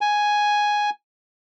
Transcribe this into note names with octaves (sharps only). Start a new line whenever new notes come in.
G#5